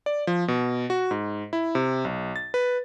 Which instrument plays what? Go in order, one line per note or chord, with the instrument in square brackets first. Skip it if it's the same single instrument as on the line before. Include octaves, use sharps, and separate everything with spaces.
[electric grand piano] D5
F3
B2
F#4
G#2
E4
C3
B1
A6
B4